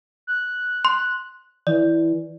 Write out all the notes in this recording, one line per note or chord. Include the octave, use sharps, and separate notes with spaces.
F#6
C6
E3 D5